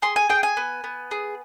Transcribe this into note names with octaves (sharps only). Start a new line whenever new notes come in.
G#4 C6
G#5
G#4 G5
G#5
B3
B3
G#4